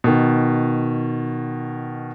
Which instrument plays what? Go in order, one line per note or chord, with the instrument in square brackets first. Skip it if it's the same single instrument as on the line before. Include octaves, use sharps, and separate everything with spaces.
[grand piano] B2 D#3